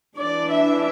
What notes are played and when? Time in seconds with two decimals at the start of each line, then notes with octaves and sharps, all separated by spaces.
0.17 E3 D4 D5
0.50 E5